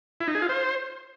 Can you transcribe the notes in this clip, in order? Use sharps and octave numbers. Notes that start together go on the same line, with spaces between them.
E4
D#4
G#4
F4
C5